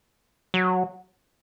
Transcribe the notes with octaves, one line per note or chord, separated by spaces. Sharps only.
F#3